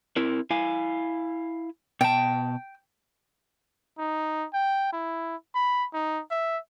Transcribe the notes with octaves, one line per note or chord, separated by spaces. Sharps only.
C4 E4 A#4
E4 F5 G#5
B2 G5 A5
D#4
G5
E4
B5
D#4
E5